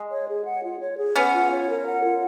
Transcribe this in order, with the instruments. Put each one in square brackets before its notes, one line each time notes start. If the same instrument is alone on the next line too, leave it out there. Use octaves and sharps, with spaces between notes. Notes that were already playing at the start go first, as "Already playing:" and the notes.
Already playing: [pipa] G#3
[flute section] C#5
G#4
F#5
F4
C#5
G#4
[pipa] B3 C#4 [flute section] F#5
[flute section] F4
C#5
A#4
F#5
F4